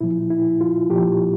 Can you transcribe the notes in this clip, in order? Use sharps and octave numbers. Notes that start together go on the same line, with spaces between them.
A#2 F3 E4
E4
F4
A#2 F3 G4